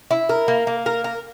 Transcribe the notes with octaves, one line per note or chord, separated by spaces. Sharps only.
E4
A#4
A#3
A#3
A#4
A#4